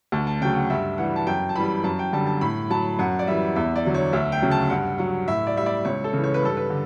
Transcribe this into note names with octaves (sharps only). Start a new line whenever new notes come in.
D2 A5
A5
C#3 F#3 G5
F#5
G2 E5
E3 G3 F#5
A5
F#2 G5
A5
E3 G3 B5
F#2 A5
G5
D3 G3 A5
A5
A2 B5
F#3 A5
F#2 F#5
D5
E3 G3 E5
E2 E5
D5
D3 F#3
C#5
D2 E5
G5
C#3 F#3
A5
G2 F#5
F#3 F#5
A2 E5
D5
G3 E5
D5
C#2 C#5
A4
C#3 E3
C#5
B4
G2 A4
B4
D3